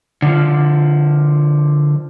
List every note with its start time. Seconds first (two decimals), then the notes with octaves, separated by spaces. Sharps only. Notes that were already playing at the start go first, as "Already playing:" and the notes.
0.22 D3 F3